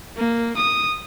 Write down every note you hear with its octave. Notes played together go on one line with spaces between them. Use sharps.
A#3
D#6